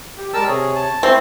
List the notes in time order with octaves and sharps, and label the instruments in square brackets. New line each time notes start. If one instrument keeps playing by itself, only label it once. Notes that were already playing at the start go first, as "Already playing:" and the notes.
[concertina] G4
[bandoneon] G3 G#3 G4 [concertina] A#4 A5 E6
[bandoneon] C3 C#5 [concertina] G#4
[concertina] A5
[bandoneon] A3 E4 [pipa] C4